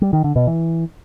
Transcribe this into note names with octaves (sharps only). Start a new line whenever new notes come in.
G3
D#3
D3
B2
E3